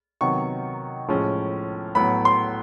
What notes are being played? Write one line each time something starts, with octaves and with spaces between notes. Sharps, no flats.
C3 D#3 F#3 B3 C#6
A2 F3 G#3 C#4
A2 F#3 B3 B5
C6